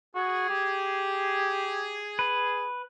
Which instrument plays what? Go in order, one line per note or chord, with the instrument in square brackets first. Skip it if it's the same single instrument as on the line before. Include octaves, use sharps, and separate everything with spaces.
[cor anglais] F#4 [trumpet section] G#4
[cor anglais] G4
[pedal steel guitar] B4